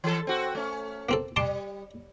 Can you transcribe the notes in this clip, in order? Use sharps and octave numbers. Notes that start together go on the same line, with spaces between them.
E3 A4
C4 F#4
A3 C#4
A#3 C4 A4
G3 A5 C6 D6